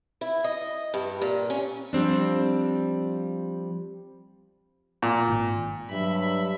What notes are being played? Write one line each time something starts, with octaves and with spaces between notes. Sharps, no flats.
E4
D#5
G2
A#2
C#4
F3 G3 C4 D4
A#2
G#1
G2 F#3 E5 B5